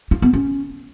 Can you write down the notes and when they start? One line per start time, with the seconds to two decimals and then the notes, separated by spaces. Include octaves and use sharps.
0.11 F4
0.22 B3
0.33 C#4